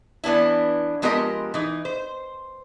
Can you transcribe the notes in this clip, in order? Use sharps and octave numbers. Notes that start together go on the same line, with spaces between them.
E3 B3 D4 E4
F3 G#3 B3 G4 A#4 D#5
E3 D#4
C5